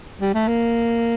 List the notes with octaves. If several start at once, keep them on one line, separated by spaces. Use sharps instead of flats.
G3
A3
A#3